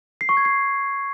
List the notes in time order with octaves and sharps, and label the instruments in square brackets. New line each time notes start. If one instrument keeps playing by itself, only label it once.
[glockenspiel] C7
C#6
G#6
C7